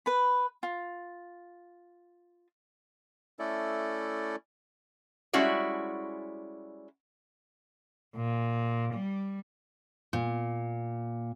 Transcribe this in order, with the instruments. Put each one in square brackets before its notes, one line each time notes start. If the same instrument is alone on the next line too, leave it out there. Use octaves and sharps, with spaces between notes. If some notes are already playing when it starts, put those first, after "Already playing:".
[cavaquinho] B4 B5
F4
[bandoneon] A3 C#4 E4 A4 D5
[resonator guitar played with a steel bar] G3 G#3 C#4 E4 F#4 D5
[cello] A#2
G3
[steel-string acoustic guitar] A#2